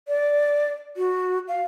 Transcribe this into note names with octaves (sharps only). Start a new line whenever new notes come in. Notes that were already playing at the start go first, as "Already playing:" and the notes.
D5
F#4
F5